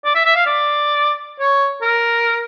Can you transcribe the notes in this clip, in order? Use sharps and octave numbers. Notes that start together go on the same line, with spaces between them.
D5
E5
E5
F5
D5
C#5
A#4